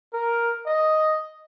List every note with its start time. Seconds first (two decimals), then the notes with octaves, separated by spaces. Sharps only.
0.13 A#4
0.66 D#5